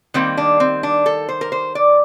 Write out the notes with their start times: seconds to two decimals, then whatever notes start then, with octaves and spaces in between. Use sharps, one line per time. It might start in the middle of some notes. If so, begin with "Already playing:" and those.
0.14 D#3 G3 A#3 C4
0.37 D4
0.60 C4
0.83 D4
1.06 A4
1.29 C5
1.41 A#4
1.52 C5
1.75 D5